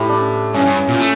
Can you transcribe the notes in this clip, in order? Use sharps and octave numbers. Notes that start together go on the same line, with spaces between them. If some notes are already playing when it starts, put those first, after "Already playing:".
Already playing: A2 E4 G4
D4
G2 C#4
G2
A#2
A3